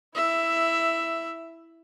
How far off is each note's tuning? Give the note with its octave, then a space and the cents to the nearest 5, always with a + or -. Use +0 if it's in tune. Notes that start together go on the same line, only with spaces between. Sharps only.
E4 +0 E5 +10